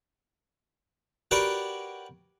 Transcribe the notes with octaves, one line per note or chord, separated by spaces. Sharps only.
F#4 G4 A#4 B4 C#5 D5